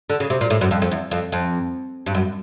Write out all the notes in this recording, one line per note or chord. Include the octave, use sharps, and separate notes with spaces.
D3
C#3
C3
A#2
A2
F#2
F2
F2
E2
F2
F2
G2
F#2